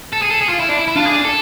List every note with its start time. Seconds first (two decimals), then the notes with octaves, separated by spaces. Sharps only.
0.13 A4
0.22 G#4
0.31 A4
0.41 G#4
0.49 F4
0.60 E4
0.69 D4
0.78 E4
0.88 E4
0.96 D4 F4
1.06 G#4
1.25 A4